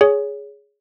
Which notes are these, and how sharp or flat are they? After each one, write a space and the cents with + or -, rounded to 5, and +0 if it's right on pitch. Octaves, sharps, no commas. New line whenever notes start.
G#4 +0 C#5 +20